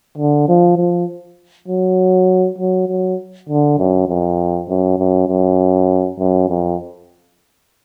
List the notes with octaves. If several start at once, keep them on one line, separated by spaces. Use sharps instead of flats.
D3
F3
F3
F#3
F#3
F#3
D3
F#2
F2
F#2
F#2
F#2
F#2
F2